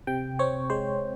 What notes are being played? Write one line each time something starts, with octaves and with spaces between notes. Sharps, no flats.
C3 G5
C4 C#5
G#3 C5